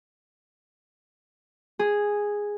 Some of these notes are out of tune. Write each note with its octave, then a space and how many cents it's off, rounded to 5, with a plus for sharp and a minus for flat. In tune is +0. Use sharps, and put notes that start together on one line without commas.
G#4 -5